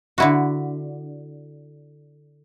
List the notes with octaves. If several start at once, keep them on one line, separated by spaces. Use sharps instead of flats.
D3 E4 F#4